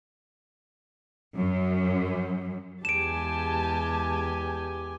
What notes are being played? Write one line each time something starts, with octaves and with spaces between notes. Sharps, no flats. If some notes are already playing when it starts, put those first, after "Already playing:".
F#2
E2 G#3 G4 G#5 A5 D7 E7